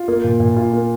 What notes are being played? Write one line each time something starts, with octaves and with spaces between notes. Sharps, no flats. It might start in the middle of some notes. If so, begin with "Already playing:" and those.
Already playing: F4
A#3
A#2
A#2
F4
A#3